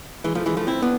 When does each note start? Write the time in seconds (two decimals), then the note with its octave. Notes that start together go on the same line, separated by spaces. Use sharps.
0.24 E3 G#3
0.35 F3 A3
0.46 E3 G#3
0.57 F3 A3
0.67 C4 E4
0.82 B3 D4